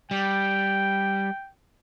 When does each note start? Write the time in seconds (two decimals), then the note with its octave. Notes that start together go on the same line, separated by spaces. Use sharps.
0.11 G3 G5